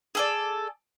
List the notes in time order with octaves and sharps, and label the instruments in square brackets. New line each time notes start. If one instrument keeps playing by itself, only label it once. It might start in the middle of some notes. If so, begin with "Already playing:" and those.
[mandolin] G#4 A4 D5